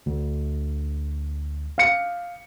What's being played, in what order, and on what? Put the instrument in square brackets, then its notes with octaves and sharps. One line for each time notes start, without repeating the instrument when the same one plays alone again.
[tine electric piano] D2
[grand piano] F5 C#7